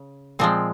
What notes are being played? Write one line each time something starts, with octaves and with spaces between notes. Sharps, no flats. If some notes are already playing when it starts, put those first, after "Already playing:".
Already playing: C#3
A#2 F3 G#3 C4